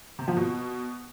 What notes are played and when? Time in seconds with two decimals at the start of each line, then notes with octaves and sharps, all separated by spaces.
0.19 C3
0.28 F3
0.37 B2